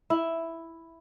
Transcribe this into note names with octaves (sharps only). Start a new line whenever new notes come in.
E4